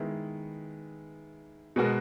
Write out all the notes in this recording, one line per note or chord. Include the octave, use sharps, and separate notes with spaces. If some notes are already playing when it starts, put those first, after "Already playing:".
Already playing: D#3 G#3 B3 E4
B2 G#3 B3 F#4 A#4